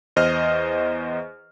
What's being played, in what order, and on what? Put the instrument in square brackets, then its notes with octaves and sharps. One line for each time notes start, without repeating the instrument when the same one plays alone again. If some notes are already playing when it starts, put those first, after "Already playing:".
[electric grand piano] E2 C5 D#5 F6